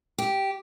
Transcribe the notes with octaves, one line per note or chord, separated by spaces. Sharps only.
G4